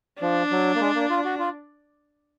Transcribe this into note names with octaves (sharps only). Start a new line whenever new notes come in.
F3 D4
F#3
A#3
G#3
A#3
F4
F#4
F4